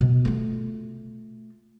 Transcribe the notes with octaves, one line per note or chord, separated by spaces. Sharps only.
B2
A3 F4